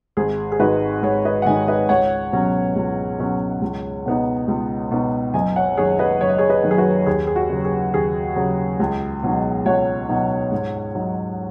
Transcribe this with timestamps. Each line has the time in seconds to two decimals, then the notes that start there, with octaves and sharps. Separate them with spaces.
0.17 G#1 G#4
0.52 G#4
0.60 G#2 D#3 G#3 D#4 F#4 B4
1.02 G#1 G#4 C#5
1.25 B4 D#5
1.42 F#5
1.46 G#2 D#3 G#3 D#4 D#5 G#5
1.68 B4 D#5
1.89 C#2 C#5 F#5
2.32 B2 F#3 C#4
2.76 C#2
3.19 B2 F#3 C#4
3.62 C#2
4.05 B2 B3 D#4
4.48 C#2
4.91 B2 B3 D#4
5.34 F#1 D#5 G#5
5.56 C#5 F#5
5.77 F#2 D#3 G#4 C#5
5.99 B4 D#5
6.21 F#1 C#5
6.29 D#5
6.38 G#4 C#5
6.49 B4 D#5
6.63 F#2 D#3
6.71 G#4
6.78 F#4 B4
7.06 D#2 G#4
7.27 G#4
7.36 F#4
7.50 C#3 F#3
7.65 G#4
7.94 D#2 G#4
8.36 C#3 F#3
8.80 C#2
9.23 B2 F#3 D#4
9.66 C#2 C#5 F#5
10.09 B2 F#3 D#4
10.52 G#2
10.95 F#3 D#4